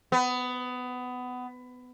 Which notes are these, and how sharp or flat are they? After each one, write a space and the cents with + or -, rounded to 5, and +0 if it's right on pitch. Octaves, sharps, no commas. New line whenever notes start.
B3 +20